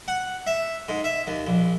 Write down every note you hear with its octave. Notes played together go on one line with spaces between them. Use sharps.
F#5
E5
G#2
E5
D#2
A#1